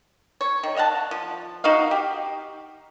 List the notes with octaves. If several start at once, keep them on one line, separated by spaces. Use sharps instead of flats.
C#5
D#3
D#5 F5 F#5 A5
F3
D#4 F#4 D#5 F5
G4